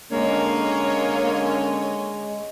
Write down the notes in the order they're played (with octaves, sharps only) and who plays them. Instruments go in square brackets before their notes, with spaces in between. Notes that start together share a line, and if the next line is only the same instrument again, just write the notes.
[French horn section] D3 C#4 [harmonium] G#3 [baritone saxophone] A#3 [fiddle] C#5 D#5